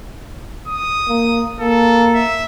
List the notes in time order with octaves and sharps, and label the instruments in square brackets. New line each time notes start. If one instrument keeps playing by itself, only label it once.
[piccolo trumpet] D#6
[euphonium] A#3
[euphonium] A#3 [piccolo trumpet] A4
[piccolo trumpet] E5